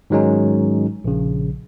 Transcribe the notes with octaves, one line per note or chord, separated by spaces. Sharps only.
G#2 D#3 F#3 G#3 C#4 D#4
A#1 C#3